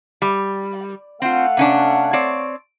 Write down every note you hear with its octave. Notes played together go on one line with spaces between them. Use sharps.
G3
A3 C4 F4 F5 F#5
C3 C#4 D4
C4 C#5 D5